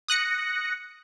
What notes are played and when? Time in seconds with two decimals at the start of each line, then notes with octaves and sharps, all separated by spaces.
0.08 D#6 F#6 A#6 C#7